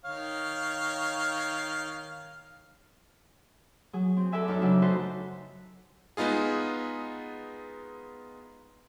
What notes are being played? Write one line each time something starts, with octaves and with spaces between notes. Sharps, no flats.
D#3 C#5 F5
F#3 G#4
C4
A4 B4 D5 E5 G#5
F#2 D#4 E5 D6 F6
C#3 F#3 D4
D#4 F#4 A4 B4 C5
G#3 B3 D#4 F4 G#4